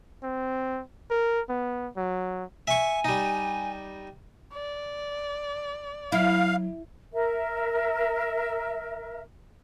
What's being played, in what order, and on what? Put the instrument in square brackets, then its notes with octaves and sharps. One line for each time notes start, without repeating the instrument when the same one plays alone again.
[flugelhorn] C4
A#4
B3
F#3
[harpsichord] E5 C#6 [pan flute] G#5
[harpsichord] G3 D#4
[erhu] D5
[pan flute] F#3 [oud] E4 [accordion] F5
[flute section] A#4 E5